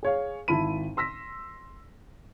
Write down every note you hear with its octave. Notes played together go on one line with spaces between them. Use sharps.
G#4 C#5 F5
G#1 E4 A5 B5 D#7
C6 E6 A#6 B6